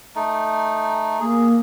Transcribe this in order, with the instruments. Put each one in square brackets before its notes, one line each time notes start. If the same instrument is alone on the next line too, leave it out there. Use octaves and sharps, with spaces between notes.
[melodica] A3 D#4
[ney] A#3 [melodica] G#4